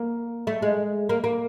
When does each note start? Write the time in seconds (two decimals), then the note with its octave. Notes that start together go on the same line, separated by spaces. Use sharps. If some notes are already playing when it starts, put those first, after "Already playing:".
Already playing: A#3
0.47 A3
0.62 G#3
1.09 A#3
1.24 A#3